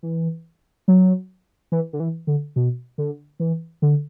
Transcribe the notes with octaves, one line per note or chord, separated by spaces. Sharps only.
E3
F#3
E3
D3
E3
D3
B2
D3
E3
D3